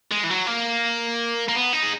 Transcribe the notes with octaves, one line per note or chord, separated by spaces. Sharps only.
G#3
E3
F#3
A#3
A#3
B3
D#4
G#4